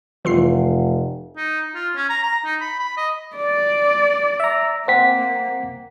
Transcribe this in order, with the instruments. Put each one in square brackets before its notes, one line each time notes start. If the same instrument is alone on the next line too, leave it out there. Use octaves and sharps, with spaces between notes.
[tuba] F1 [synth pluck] E3 F4 C7
[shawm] D#4
F4
C#4
A#5
A#5
D#4
B5
B5
D#5
[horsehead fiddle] D5
[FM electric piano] E5 A#5
[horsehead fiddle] A#3 [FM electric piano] C4 [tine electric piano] F#5 B6